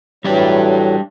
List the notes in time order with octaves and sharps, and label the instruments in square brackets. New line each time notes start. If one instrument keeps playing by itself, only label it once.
[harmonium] A2 E3 F#3 [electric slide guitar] G3 D4 G4